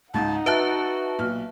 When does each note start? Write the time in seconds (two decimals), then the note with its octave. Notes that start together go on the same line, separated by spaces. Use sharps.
0.14 C#2 G#2 D#4 F#5 A5
0.46 F#4 B4 E5 A5 F#6 D7
1.19 B1 A#2 F6